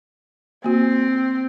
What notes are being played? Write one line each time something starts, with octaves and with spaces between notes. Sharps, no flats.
A#3 C4 F#4